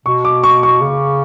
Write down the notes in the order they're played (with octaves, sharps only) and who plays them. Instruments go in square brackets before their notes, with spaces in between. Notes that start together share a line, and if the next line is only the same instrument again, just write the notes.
[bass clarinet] B2 [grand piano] C#6
[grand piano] D6
C#6
C#6
[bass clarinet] C#3